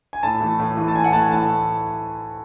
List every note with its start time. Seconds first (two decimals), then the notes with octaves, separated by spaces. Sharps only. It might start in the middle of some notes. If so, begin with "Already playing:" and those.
0.13 G#5
0.23 A2 A5
0.41 E3 A3
0.59 A2
0.77 E3 A3
0.88 A5
0.95 A2 G#5
1.04 F#5
1.13 E3 A3 A5
1.22 G#5
1.31 A2 A5